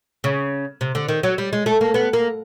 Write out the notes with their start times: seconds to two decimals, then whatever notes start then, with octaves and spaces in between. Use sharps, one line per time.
0.24 C#3
0.81 C3
0.95 D3
1.09 D#3
1.23 F#3
1.38 G3
1.53 G#3
1.66 A3
1.81 A#3
1.94 B3
2.13 A#3